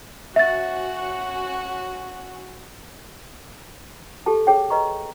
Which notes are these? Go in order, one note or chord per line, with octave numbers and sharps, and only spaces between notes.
C#4 F#4 E5 A6
G4 A4 A5
G#4 C#5 G5
B4 D#5 A#5 C#6